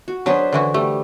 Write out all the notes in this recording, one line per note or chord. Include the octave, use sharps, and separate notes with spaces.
F#4
F#3 D4 G#4 B4 C5
D3 E3 F#4
G3 A3